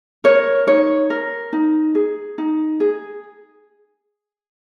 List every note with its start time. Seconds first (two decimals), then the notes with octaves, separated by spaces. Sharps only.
0.24 A#4 C#5
0.67 D#4 C#5
1.10 A#4
1.53 D#4
1.95 G#4
2.38 D#4
2.80 G#4